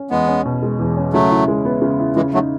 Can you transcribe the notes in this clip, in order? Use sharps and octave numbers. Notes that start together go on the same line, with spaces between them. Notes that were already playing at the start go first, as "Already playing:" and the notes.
Already playing: C#4
E2 G#3 B3
C#4
B2
G#3
E2
C#4
C#3 F#3 A3
E4
G#3
B3
C#3
E4
C#3 E3 G#3
F#3 A3 D#4